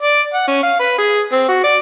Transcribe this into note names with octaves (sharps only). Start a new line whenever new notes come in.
D5
F#5
C#4
F5
B4
G#4
C4
F#4
D5